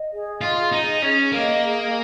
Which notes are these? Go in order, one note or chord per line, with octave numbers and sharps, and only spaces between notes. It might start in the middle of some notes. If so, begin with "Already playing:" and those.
Already playing: D#5
G#4
F4 D#5
D#4 G#4
C#4 G#4
A#3 D#5
G#4